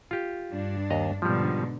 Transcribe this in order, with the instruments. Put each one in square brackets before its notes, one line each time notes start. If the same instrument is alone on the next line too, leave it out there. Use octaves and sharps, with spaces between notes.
[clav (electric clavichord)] F4 G4
[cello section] G2 D4
[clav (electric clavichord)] D#2 D#5 A#5
[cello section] G#2 B2 D3 [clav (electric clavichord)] F3 G3